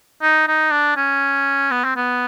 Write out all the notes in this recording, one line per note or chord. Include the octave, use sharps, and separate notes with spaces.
D#4
D#4
D4
C#4
B3
C4
B3